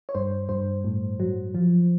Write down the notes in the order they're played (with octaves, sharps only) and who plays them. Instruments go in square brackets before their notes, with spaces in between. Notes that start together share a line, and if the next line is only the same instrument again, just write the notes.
[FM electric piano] C#5
G2 C5
G2 C5
A2
F#3
F3